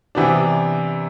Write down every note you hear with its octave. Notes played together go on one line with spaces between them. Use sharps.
C3 E3 B3 D4